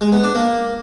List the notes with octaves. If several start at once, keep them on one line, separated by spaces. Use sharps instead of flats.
G#3
B3
D4
A#3